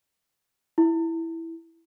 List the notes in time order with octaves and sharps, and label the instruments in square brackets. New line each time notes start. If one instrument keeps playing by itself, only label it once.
[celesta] E4